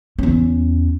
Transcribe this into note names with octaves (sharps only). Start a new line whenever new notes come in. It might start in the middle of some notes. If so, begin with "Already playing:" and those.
E2 C#4